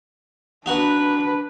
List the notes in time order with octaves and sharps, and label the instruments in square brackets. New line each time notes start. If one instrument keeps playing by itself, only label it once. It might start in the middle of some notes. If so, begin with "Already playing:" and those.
[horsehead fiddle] D4 B4 [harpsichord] D#4 F#4 F#5